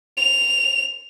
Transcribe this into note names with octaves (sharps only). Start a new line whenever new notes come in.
F7